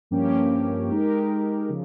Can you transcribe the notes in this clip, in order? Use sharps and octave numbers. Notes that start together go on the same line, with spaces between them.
G2 F3 A#3 C#4 G4
G#3 D#4 G4 A#4
C#3 F3